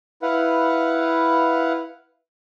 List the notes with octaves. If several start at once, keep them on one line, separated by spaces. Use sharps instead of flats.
E4 B4 F5 F#5